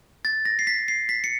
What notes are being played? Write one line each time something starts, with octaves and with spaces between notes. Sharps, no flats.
A6
A#6
C7
B6
C7
B6
C#7